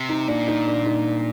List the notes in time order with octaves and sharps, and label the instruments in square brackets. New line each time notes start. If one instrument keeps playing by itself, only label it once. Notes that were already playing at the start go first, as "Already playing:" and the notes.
Already playing: [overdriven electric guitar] C3
[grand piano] D#4
[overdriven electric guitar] A#2 [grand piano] D4
[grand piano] D#4
D4
D#4